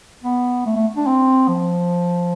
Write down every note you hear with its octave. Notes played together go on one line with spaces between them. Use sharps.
B3
A3
A3
D4
C4
F3